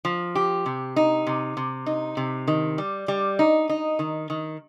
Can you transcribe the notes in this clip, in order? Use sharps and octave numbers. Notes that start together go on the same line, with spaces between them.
F3
G4
C3
D#4
C3
C3
D#4
C3
D#3
G3
G3
D#4
D#4
D#3
D#3